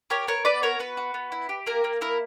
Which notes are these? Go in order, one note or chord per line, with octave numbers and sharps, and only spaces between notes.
G4 A#4 C#5
B3 A#4 C#5
B3 B4 D5
F#4 A#4 C#5
B3 B4
F#4
B3
E4
G4
A#3 A#4
A#3
E4 A#4